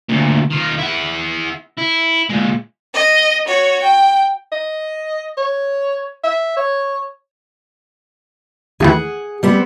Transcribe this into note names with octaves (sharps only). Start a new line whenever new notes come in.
D2 A#2
D#3 F4
E4 F#5
E4
A#2 G#3
D#5
F#4 C#5
G5
D#5
C#5
E5
C#5
D#2 A2 E3 G#4 F#5
G3 B3 C4